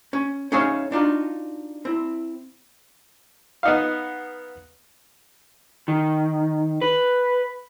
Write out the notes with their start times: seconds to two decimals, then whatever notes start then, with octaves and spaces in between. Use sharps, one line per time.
0.13 C#4
0.52 C#4 D#4 G#4 C#5 E5 F5
0.92 D4 D#4 F4 F#4
1.85 C4 E4
3.63 B3 D#4 F5
5.88 D#3
6.81 B4